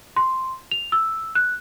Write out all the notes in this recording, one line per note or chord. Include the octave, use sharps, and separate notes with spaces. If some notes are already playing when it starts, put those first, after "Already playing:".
C6
F7
E6
F#6